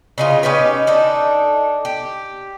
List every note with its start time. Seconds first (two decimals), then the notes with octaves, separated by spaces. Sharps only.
0.18 C#3 D#4 F4
0.43 C#4 D#4 G4 B4
0.87 D4 D#4 A4
1.85 G4